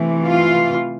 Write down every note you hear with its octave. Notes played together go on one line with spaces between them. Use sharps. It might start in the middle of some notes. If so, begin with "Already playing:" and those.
Already playing: C3 E3 A3
F4